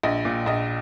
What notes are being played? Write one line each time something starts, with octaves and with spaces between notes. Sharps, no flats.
A#1 D#5
A#2
A#1 D#5